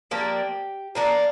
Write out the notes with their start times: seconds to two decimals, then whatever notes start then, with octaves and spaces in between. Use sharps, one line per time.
0.11 F3 A#3 D4 G4
0.95 F3 A#3 D4